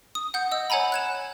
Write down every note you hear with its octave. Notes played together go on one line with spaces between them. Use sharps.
D#6
F#5 G6
D#5 E6
C#5 F#5 G#5 A#5 B5
F#6 G#6 E7